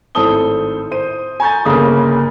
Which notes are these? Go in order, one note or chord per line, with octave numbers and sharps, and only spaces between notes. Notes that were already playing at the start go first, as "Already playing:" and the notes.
G#1 A2 A4 C5 D#6 G7
C5 D#7
G#5 A#5 C#6 G6 A6
G1 C#3 A#3 A#5 D#6